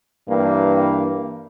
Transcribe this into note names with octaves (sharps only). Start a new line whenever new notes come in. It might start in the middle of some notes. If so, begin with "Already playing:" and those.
G2 E3 A#3